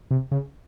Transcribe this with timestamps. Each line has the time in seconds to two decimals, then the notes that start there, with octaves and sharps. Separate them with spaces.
0.11 C3
0.32 C#3